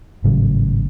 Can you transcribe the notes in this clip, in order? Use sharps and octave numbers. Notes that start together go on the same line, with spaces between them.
G#1 A2 C#3 F#3